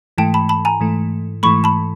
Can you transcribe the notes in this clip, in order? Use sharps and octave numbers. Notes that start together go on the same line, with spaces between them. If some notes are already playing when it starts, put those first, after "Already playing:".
G#2 E3 A3 G5 A5
A5 B5
A5 B5
G#5 A#5
G#2 E3 A3
G#2 E3 A3 B5 C#6
A5 B5